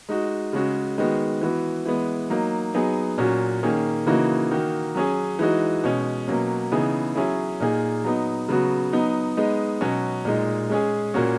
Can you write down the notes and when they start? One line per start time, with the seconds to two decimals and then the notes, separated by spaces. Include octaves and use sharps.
0.09 G#3 D#4 F#4
0.53 C#3 G#3 C#4 F#4
0.98 D#3 G#3 B3 F#4
1.41 E3 B3 F#4
1.86 E3 G#3 B3
2.30 F#3 A#3 D#4
2.74 F#3 B3 D#4 G#4
3.18 A#2 F#3 C#4 F#4
3.63 D#3 A#3 C#4 G#4
4.06 C#3 E3 A#3 D#4 F#4
4.51 D#3 A#3 D#4 F#4
4.95 F#3 C#4 G#4
5.39 E3 G#3 D#4 F#4
5.84 B2 G#3 C#4
6.28 B2 F#3 A#3 C#4
6.72 C#3 E3 B3 D#4 G#4
7.16 F#3 C#4 E4 G#4
7.60 A#2 A#3 D#4 G#4
8.04 F#3 B3 D#4
8.49 C#3 F#3 B3 F#4
8.93 F#3 B3 D#4
9.37 G#3 B3 D#4
9.81 B2 F#3 C#4 F#4
10.25 A#2 G#3 D#4
10.70 G#3 C#4 G#4
11.14 A#2 A#3 C#4 F#4